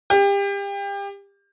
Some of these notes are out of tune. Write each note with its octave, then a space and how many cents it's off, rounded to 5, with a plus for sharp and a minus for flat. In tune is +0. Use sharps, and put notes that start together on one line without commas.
G4 +30